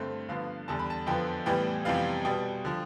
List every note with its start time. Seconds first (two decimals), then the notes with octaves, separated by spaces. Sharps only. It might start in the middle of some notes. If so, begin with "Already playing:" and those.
Already playing: G2 D3 A3 C4 C5
0.28 G2 D3 F3 B3 F5
0.68 E2 D3 G3 A5
0.79 B5
0.90 A5
1.07 F2 D3 F3 B3 G5
1.46 A2 E3 G3 B3 G5
1.85 F2 C3 E3 G3 B3 F5
2.25 B2 G3 B3 G5
2.65 D3 F3